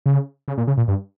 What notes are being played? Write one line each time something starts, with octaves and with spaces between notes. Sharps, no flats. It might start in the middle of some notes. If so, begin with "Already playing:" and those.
C#3
C#3
A#2
C#3
A#2
G2